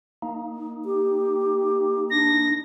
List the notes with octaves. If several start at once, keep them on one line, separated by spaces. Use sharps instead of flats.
A#3 D#4
G4
D4 A#6